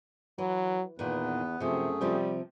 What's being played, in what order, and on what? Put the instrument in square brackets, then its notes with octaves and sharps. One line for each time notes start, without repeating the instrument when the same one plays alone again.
[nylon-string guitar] E3 [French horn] F#3
[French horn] E2 [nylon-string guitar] A#2 D#3 [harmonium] B3 B4
[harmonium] F#2 A3 G#4 [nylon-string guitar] C3 F3 [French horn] C4
[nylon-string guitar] C3 F3 C4 [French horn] G3